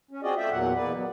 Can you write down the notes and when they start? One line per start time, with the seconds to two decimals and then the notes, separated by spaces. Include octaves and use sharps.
0.11 C#4
0.23 C4 F4 F#4 G#4 D5 D#5
0.37 A3 F4 D5 E5 G5
0.51 E2 A#2 F#3 F#5
0.75 E2 B2 A#3 B4 D5
0.93 F#3 B3